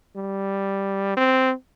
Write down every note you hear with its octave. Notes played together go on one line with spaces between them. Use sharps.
G3
C4